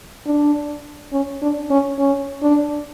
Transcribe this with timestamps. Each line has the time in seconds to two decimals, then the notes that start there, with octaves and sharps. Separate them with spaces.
0.26 D4
1.12 C#4
1.42 D4
1.70 C#4
1.98 C#4
2.42 D4